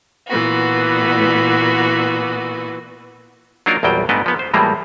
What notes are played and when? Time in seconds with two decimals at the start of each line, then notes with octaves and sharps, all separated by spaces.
0.28 A#2 E3 B3 F#4
3.66 F#3 A#3 D4 D#4 F4 A#4
3.83 A#1 E2 F#3 G3 G5
4.09 G#2 G3 A3 B3 D4 D#5
4.26 F3 B3
4.39 C5
4.54 A2 E3 F3 G3 G#3 A#3